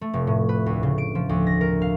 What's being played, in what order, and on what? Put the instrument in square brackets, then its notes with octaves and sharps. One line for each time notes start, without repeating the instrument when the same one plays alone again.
[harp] A3
F1
A2
B4
D2
C#3
D7
F3
D2
A#6
A#4
F5